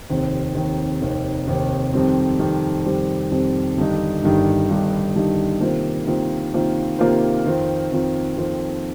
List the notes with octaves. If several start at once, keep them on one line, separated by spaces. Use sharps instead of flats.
F1 D#2 D#3 C4
F1 D#2 D#3 C4
F1 D#2 D#3 C4
F1 D#2 D#3 C4
F2 D#3 G3 C4
F2 D#3 G3 C4
F2 D#3 G3 C4
F2 D#3 G3 C4
G1 G2 D#3 G3 D#4
G1 G2 D#3 G3 D#4
G1 G2 D#3 G3 D#4
G1 G2 D#3 G3 D#4
C3 D#3 A#3 F4 C5
C3 D#3 A#3 F4 C5
C3 D#3 A#3 F4 C5
C3 D#3 A#3 F4 C5
F2 D#3 C4 F4 C5
F2 D#3 C4 F4 C5
F2 D#3 C4 F4 C5